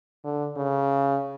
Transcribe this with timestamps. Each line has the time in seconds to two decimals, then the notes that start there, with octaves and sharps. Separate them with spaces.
0.24 D3
0.56 C#3